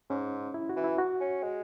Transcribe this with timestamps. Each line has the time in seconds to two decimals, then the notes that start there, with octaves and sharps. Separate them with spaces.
0.10 G#2 C#4
0.54 E4
0.69 F#4
0.76 E3
0.84 E4
0.98 F#4
1.20 C#4
1.43 G#3